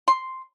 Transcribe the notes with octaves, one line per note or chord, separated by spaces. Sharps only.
C6